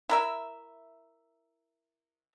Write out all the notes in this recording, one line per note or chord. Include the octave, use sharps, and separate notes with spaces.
E4 A#4 E5